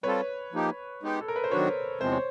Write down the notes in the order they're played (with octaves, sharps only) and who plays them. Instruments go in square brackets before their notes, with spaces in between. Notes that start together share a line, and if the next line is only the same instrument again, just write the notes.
[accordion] G3 C4 F4 A4 [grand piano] B4 C#5
[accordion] F3 A#3 D#4 G4
G#3 B3 D#4 G4
[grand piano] A4
A#4
B4
C5
[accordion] D#3 F#3 B3 D4 F#4 [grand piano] B4 C#5
[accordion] E2 C3 F3 G#3 C4 [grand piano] C5
[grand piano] C#5